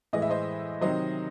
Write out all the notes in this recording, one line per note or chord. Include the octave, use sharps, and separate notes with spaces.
A2 E3 G#3 D#5
E5
C5 D#5
C3 D#3 F#3 C5 D#5